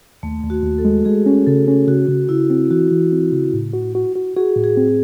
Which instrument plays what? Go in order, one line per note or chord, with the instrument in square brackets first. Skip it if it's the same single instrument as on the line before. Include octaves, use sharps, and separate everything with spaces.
[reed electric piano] D#2 [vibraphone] A3
[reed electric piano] D#2
[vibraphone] F#4
[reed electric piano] D#2
[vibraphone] A4
[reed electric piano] G#3
[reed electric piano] G#3 [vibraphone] G#4
[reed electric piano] C#4
[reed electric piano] C#3 [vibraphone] A4
[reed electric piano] C#4
[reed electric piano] C#3 [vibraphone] F#4
[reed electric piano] C#3
[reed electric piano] C#3 [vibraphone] E4
[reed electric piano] C4
[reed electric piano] E3 [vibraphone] F#4
[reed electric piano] E3
C4
C#3
A2
F#4
F#4
F#4
[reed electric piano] F#4 [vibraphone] G#4
[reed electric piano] A2
[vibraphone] G#4
[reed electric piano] C4